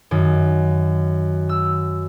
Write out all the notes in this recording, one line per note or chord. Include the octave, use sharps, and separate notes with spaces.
F#2 D#3
E6